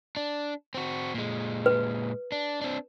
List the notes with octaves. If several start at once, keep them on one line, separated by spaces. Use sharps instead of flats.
D4
C4 F#4
A#2 G#3
B4
D4
C4 D4